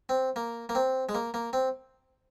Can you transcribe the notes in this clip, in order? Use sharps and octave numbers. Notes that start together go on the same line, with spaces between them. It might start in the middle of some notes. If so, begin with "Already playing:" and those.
C4
A#3
A#3
C4
G#3
A#3
A#3
C4